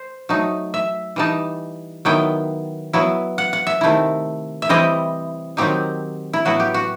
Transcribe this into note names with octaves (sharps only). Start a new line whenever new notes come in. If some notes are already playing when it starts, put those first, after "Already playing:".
Already playing: C5
F#3 A3 D#4
E5
E3 G3 D#4 A5
D#3 F#3 B3 E4 G5
F#3 B3 E4
F#5
F#5
E5
C3 D#3 A3 E4
E5
E3 G3 C4 E4 D#5
D#3 F#3 C4 D#4 G4
E4
A2 F#3 B3 E4 F#4
G4
F#4